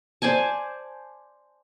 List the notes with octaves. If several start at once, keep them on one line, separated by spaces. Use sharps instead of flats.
C5 D5 G#5 A5